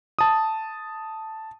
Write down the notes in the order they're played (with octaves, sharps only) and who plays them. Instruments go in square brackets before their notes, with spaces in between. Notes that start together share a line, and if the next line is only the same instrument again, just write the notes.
[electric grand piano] A5 D#6